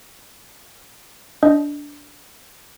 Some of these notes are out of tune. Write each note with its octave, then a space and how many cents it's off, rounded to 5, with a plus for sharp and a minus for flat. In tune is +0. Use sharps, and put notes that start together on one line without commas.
D4 -15 D#5 +0